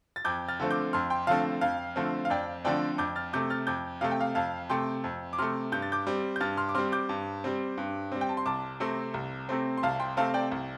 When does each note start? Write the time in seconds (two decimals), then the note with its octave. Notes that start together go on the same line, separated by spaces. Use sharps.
0.16 A6
0.25 F2 D6 G6
0.48 F6 A6
0.60 D3 F3 A3 C4
0.71 D6 G6
0.93 F2 C6 F6
1.10 G5 C6
1.27 D3 F3 A3 C4 F5 A5
1.61 F2 F5
1.96 D3 F3 A3 C4
2.25 F5
2.30 F2 D5 G5
2.64 D3 F3 A3 C4 D5 G5
2.98 F2 D6 G6
3.16 F6 A6
3.33 C3 A3 D6 G6
3.50 F6 A6
3.67 F2 D6 G6
4.01 C3 A3 F5
4.11 G5
4.21 F5
4.35 F2 F5 A5
4.70 C3 A3 G5 C6
5.04 F2
5.33 D6
5.38 C3 A3 C6 F6
5.72 G2 G6
5.82 A6
5.92 D6 G6
6.07 G3 C4
6.36 G6
6.40 G2 F6 A6
6.57 C6 F6
6.69 D6
6.75 G3 C4 C6 F6
6.92 D6 G6
7.09 G2
7.44 G3 C4
7.78 G2
8.12 G3 C4
8.21 G5
8.29 A5
8.37 C6
8.46 C2 A5 D6
8.80 C3 A3 C4
9.14 C2
9.49 C3 A3 C4
9.77 C6
9.83 C2 F5 A5
10.00 G5 C6
10.17 C3 A3 C4 F5 A5
10.34 D5 G5
10.51 C2